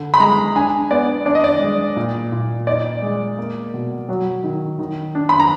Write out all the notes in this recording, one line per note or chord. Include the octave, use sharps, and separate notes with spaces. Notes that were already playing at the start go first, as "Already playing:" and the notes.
Already playing: D3
B5
G#3 A#5
D4 G#5
B3 D5
D4 D5
D#5
D5
G#3
A#2
A#2
D#4 D5
G#3
A#3
B2
F#3
D#3
D#3
D4
B5
A#5